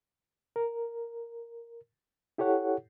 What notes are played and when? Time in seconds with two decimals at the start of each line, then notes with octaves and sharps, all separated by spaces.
0.56 A#4
2.38 E4 G4 A4 C#5 F#5